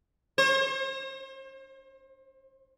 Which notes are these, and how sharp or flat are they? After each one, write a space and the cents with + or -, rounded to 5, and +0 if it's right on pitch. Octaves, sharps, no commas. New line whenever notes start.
C5 +40